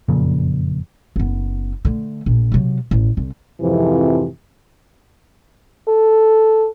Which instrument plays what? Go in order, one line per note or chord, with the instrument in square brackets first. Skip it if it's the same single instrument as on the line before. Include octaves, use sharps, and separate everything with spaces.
[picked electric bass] F#1 F2 A#2 C#3
[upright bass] F#1 B3
D3 A3
A#1
C3 F#3
A1
C2
[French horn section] F2 G#2 C3 E3 F3
[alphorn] A4